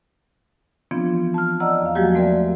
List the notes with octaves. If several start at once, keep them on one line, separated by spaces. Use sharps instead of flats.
E3 F3 B3 C4 D4 F4
A5 F6
D5 D#5 F#5 A#5 E6
E2 F5
F3 F#3 G#3 A#3 F#4 G4
A3 C4 A#4 D5 E5 G5